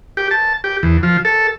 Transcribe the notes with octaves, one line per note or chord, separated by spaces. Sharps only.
G4
A5
G4
E2
F3
A4